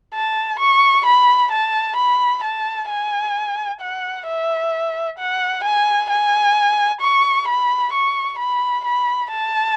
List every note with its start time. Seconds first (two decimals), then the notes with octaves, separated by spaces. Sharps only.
0.14 A5
0.60 C#6
1.06 B5
1.52 A5
1.97 B5
2.44 A5
2.89 G#5
3.81 F#5
4.27 E5
5.19 F#5
5.64 G#5
6.10 G#5
7.01 C#6
7.48 B5
7.93 C#6
8.39 B5
8.85 B5
9.30 A5